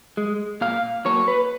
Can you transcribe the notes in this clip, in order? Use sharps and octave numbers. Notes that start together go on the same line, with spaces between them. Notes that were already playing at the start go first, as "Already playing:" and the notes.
G#3
A#2 F5
F#3 A#3 C#5
B4